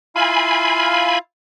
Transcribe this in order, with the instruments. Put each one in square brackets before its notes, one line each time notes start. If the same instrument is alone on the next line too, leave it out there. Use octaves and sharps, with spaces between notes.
[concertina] E4 F4 F5 [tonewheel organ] G#5 B5